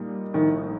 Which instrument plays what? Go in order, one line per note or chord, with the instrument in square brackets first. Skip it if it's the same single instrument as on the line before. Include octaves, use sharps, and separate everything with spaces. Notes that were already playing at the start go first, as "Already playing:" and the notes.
Already playing: [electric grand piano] A#2 G3 A#3 D#4
[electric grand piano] A#1 A2 A3 D#4 [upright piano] D#3